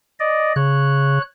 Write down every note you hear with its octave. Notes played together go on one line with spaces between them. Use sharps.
D5 D#5
C#3 C#5 F#6